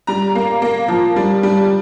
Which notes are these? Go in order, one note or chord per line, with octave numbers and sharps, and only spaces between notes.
G3 A#5
A#3
A#3
F3
G3
G3